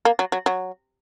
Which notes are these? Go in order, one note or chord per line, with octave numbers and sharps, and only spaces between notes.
A#3
F#3
F#3
F#3